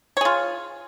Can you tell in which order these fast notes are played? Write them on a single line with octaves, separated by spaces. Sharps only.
C#5 G#4 F4